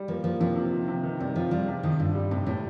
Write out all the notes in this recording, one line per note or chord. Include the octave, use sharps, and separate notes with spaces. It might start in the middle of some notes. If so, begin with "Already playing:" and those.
Already playing: G3
F3 A#3
F3 A#3
C3 F3
C3
D#3
C3
D#3
C3 G3
F3 F4
G3 F4
C3
D#3 F3
G2 D3
G3
A2 C3
A2 C3